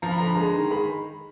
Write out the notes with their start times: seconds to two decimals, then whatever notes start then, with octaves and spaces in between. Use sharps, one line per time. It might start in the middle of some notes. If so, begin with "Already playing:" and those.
0.02 F3 A#5
0.11 B5
0.18 D3 A#5
0.27 B5
0.34 G#3 A#5
0.54 D#3
0.71 G#3 B5